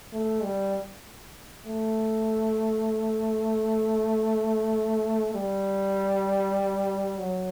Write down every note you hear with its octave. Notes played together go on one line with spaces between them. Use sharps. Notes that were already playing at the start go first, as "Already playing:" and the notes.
A3
G3
A3
G3
F#3